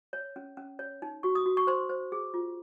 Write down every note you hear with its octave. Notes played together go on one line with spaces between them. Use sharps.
C#5
C#4
C#4
C#5
D#4
F#4 C#6
D#6
F#4
C#6
C5 C6
C5
G#4
F4